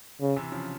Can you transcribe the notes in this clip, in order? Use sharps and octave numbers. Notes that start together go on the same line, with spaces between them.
C#3
C3 E3
C#3 F3